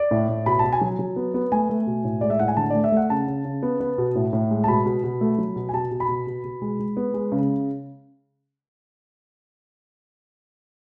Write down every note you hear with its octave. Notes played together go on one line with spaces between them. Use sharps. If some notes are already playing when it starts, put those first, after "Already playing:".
Already playing: D5
A2
A2
B2 B5
B2 A5
G#5
F#3
F#3
B3
B3
A3 G#5
A3
B2
A2
G#3 D5
E5
A2 F#5
G#5
D3 A5
A3 D5
E5
A3 F#5
C#3 A5
C#3
C#3
B3
B3
B2
A2
A2
G#3
A5
B2 B5
B2
B2
A3
F#3
B2
G#5
B2 A5
B2
B5
B2
B2
B2
G#3
G#3
B3
G#3
C#3